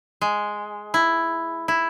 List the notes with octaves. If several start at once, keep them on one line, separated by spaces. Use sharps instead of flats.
G#3
E4
E4